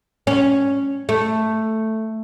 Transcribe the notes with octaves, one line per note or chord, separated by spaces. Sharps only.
C#4
A3